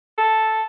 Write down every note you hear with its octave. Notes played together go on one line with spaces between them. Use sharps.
A4